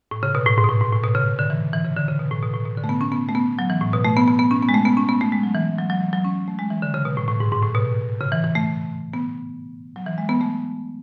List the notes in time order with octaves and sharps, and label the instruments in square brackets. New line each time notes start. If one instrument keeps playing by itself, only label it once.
[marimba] A2
C#3
B2
A2
G#2
B2
A2
G#2
A2
B2
C#3
D3
E3
E3
C#3
D3
C#3
B2
A2
B2
A2
B2
D3
A3
B3
C#4
B3
A3
B3
F#3
E3
A2
B2
A3
B3
B3
B3
C#4
B3
G#3
A3
B3
C#4
B3
A3
G#3
F#3
E3
F#3
F#3
E3
F#3
C#4
A3
G#3
E3
D3
C#3
B2
A2
A2
G#2
G#2
A2
B2
C#3
E3
E3
A3
B3
F#3
E3
G#3
B3
A3